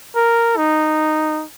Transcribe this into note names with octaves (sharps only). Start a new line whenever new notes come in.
A#4
D#4